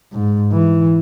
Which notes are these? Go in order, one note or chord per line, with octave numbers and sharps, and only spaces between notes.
G#2
E3